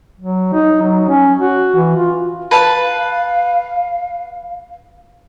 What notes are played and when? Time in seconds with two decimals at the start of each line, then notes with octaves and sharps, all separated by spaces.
0.20 F#3
0.53 D#4
0.82 F#3
1.08 C#4
1.39 F#4
1.76 E3
1.96 F4
2.51 B4 F5 A5